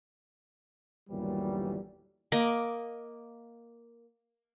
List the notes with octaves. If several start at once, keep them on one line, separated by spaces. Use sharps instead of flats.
G1 D#2 A#2 E3 F#3 G3
A#3 D#5 D6